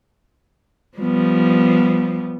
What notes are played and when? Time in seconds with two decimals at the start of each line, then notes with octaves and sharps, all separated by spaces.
0.98 F3 G3 B3